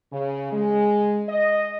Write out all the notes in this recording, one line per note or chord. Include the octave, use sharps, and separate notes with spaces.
C#3
G#3
D#5